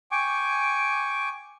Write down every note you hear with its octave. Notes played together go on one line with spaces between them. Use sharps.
G5 G#5 C#6 D6